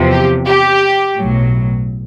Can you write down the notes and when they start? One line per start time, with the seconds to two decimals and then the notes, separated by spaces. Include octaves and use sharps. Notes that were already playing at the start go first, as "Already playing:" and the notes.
Already playing: E2 C3 F3
0.12 G4
0.47 G4
1.18 B1 A2 F#3